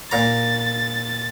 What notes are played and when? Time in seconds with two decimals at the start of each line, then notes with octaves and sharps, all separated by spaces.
0.11 A#2 A#5 A6